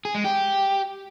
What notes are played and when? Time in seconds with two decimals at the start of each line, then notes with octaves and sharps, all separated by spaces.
0.05 G#4
0.15 G#3
0.24 G4